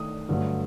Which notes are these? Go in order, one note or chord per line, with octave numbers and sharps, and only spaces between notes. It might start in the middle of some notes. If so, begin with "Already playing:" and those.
Already playing: D#3 A3 D4 D#6
G2 D3 F#3 A3